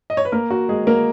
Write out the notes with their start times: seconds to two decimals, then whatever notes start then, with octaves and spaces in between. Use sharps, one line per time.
0.10 D#5
0.17 C#5
0.25 B4
0.32 A#3 A#4
0.50 F#4
0.69 G#3 G#4
0.87 A#3 A#4